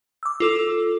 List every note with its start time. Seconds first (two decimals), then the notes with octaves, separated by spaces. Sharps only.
0.23 D6 E6
0.40 F4 A4 E6